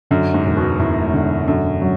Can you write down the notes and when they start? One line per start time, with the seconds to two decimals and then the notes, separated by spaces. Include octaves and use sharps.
0.11 F#2 D3
0.34 G#2
0.46 E1
0.57 B2
0.79 E1 A2
1.14 D3
1.47 F#2 D3
1.82 F#3